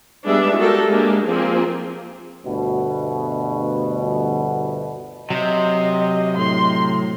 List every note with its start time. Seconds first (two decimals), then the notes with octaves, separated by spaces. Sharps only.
0.25 G3 G#3 B3 D4 G#4 E5
0.57 F#4 G4 A4 A#4
0.87 G#3 A#3 D4 G4
1.25 F3 A#3 C4 G#4
2.44 G1 D2 B2
5.30 C3 F#3 C5 D#5
6.37 A2 C6